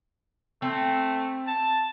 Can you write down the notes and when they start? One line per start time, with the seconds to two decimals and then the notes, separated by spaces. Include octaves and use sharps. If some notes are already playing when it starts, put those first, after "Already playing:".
0.62 A3 C4
1.47 A5